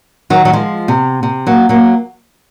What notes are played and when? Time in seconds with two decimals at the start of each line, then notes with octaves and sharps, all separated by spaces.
0.30 D#3 F#3
0.45 F#3
0.53 F3 G#3
0.88 C3
1.23 C3
1.47 F#3 A#3
1.69 F#3 A#3